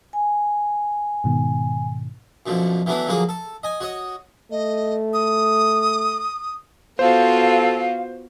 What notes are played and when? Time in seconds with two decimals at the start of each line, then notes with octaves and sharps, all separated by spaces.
0.13 G#5
1.24 G#2 B2 D#3
2.46 F#2 B2 D3 F3
2.86 E3 F#3 A3 B3 D4 E4
3.07 D3 F3 F#3 A#3 F#4 G#4
3.29 A4
3.63 D#5 G#5
3.80 F#4 C#5 D#5
4.51 A3 D#5
5.14 D#6
6.99 B3 F4 F#4 A4 C5 F5